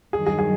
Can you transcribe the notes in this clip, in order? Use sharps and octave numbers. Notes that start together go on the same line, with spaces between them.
G2 D#3 F#3 G#4
G#4
G#4